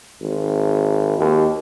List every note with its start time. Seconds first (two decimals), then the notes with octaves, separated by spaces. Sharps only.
0.22 G#1
1.18 D#2